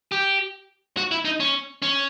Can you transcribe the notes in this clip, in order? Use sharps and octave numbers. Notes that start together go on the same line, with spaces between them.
G4
F#4
E4
D#4
C#4
C#4